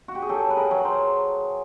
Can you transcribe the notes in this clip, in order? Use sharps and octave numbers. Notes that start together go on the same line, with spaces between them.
F#4
G4
G#4
F#3 G4 A4
B4
G#4 A#4
F#3
A#4 C5